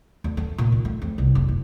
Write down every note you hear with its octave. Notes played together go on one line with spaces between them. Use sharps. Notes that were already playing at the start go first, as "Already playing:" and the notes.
D2
A3
A#2
D#3
A3
F2
C2
F#1
D1